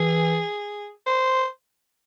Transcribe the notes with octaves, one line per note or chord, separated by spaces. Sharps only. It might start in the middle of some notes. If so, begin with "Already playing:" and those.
Already playing: E3 G#4
C5